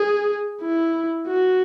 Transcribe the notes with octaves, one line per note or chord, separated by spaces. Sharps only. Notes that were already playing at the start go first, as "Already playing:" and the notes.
Already playing: G#4
E4
F#4